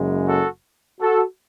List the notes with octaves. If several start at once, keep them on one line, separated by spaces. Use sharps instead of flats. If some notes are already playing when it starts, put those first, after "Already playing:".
Already playing: F#1 F#2 C#3 G#3
F#4 A4
F#4 A4